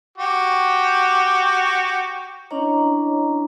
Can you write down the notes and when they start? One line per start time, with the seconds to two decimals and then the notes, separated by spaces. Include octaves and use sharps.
0.18 F#4 G4
2.51 C#4 D4 E4 C#5 D#5 A#5